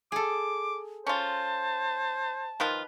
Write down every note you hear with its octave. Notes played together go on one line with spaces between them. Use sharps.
G#4 A4 D6
C#4 F4 C5 A5
D#3 F3 F4 B4